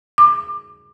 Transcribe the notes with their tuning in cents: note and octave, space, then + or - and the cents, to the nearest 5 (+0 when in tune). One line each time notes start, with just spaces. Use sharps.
D6 +25